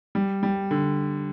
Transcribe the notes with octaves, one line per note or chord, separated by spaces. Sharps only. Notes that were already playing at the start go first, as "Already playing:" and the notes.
G3
G3
D3